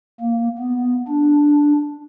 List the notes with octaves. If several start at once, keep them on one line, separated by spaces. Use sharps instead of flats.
A#3
B3
D4